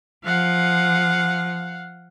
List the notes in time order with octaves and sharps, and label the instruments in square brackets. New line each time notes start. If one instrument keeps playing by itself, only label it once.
[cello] F3 [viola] F5 F#5